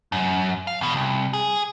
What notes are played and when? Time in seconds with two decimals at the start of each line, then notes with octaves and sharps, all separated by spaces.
0.12 F#2
0.67 F5
0.81 E2 B2
0.96 C2
1.33 G#4